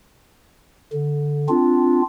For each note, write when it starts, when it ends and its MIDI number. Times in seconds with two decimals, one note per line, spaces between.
0.93 1.47 50
1.49 2.02 60
1.49 2.02 62
1.49 2.02 65